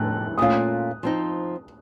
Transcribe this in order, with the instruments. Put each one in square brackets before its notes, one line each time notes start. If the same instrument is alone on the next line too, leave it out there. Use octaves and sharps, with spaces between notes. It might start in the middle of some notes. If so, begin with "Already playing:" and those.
Already playing: [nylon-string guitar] A2 [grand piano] F#6
[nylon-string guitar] A#2 A3 C#4 F4 [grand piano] D#6
[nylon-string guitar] F3 C4 D#4